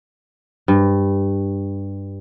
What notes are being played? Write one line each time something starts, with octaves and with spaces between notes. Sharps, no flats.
G2